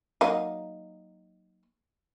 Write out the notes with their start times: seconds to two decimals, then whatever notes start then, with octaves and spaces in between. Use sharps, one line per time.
0.21 F#3 A#3 D#4